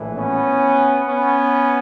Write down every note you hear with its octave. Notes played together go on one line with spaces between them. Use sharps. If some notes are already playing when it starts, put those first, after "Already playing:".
Already playing: A#1 A2 E3
B3 C#4
B3 C#4